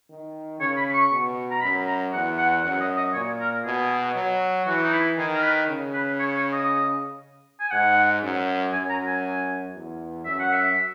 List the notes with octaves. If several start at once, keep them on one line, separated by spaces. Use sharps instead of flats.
D#3
C#3 C#5
B5
C#6
B2
A#5
F#2 B5
A#5
E2 F#5
F#5
F#2 F#5
D#5
D#5
A#2 C#5
A#4
B2 G#4
F#3
E3 F#4
D#4
E4
D#3 G#4
A#4
B4
C#3
B4
C#5
C#5
D#5
G#5
G#2 F#5
F#2
F#2 G#5
A#5
G#5
E2
F#2 E5
F#5
E5